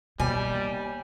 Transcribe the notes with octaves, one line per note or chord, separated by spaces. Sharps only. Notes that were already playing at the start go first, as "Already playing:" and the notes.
D#2 B2 G3 G#5